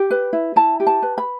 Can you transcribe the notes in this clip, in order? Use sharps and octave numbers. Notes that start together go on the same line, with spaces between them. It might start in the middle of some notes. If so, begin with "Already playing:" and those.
Already playing: G4
B4
E4
E4 A5
G4
A5
B4
B5